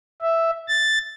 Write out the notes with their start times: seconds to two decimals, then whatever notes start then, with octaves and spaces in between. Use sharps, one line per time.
0.22 E5
0.68 A6